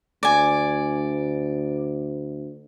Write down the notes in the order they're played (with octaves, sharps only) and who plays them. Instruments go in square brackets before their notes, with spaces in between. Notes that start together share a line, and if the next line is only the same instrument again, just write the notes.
[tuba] D2 [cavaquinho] D5 G#5